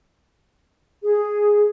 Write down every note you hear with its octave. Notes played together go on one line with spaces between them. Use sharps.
G#4